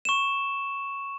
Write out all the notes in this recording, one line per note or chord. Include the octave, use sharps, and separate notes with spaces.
C#6 E7